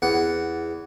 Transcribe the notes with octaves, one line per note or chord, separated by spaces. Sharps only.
E2 F#5